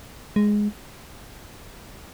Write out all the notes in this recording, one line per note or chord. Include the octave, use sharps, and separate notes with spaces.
G#3